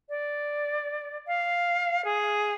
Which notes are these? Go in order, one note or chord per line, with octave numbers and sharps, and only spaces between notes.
D5
F5
G#4